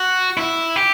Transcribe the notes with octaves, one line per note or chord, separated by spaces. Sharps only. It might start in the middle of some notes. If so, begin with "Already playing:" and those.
Already playing: F#4
E4
G4